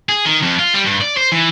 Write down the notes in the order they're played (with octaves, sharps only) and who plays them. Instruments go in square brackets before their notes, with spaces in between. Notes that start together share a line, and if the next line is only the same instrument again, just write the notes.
[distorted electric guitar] G#4
D#3
F2
F4
G3
G2
D5
C5
E3